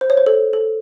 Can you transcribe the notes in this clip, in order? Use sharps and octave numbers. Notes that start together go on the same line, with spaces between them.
C5
C#5
C5
A4
A4